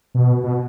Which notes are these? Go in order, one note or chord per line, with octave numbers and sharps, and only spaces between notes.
B2
B2